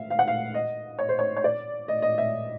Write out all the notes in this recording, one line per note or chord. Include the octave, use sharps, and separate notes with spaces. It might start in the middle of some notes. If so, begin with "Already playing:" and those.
Already playing: E5 F5
F5
F#5
F5
D#5
C#5
C5
C#5
C#5
D5
D#5
D#5
E5